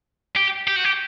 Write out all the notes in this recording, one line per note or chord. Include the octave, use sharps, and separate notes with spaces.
G4
G4
F#4
G4